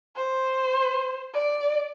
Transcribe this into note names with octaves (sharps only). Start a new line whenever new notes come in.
C5
D5